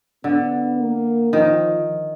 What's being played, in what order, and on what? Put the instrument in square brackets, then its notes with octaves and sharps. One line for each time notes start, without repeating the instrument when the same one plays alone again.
[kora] D3 [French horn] B3
[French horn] A#3
[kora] D#3 [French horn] F3